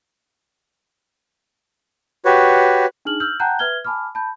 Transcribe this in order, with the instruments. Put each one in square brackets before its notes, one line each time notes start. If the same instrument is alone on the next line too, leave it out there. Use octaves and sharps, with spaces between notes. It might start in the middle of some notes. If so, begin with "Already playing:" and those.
[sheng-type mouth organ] F#4 G4 B4 C#5
[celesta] D4 D#4 G#4 F6 F#7
E6 F6 G6 F#7
F#5 G5 A5 A#5 F#6 G6
B4 E5 F6 G#6 G7
G#5 A5 B5 D6 F6
A5 B5 G6